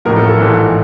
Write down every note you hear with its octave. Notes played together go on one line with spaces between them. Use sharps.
A1 A2 F3 A#4
A4
A4
A#1 G#2 E3